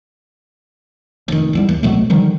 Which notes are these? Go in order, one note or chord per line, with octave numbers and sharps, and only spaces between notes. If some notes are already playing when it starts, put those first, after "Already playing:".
F1 D#3
G#1 E2 G3
D#2
C2 B2 F#3 A3
D3 D#3 F3 G3